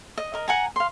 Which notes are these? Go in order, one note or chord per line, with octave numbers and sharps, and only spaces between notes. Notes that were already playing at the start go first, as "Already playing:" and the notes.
D#5
A#4 D#5
F#5 G#5 A#5
F5 C6